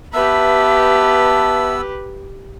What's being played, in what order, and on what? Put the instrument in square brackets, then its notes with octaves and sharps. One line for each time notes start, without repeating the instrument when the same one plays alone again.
[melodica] B3 E6 [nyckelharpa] G4 B4 [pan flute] E5 [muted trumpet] A5